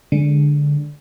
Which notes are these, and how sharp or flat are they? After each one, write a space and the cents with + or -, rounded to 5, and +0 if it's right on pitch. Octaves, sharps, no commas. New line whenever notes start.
D3 -5 G#3 +0